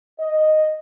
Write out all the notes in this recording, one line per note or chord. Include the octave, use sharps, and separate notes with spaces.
D#5